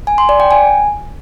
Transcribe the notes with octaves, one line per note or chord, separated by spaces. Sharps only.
G#5
C6
D5
G5
G#5